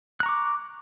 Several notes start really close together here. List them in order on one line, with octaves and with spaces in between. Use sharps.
F#6 A#5 C#6 D6